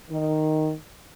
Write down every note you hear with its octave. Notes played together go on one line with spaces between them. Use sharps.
D#3